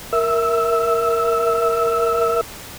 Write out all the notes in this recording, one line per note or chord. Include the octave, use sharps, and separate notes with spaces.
A#4 E5 E6